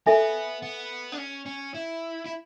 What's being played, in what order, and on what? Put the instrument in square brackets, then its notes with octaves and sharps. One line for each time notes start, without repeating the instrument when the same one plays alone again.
[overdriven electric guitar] B3 [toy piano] A4 E5 G#5
[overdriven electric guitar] B3
D4
C#4
C#4
E4
E4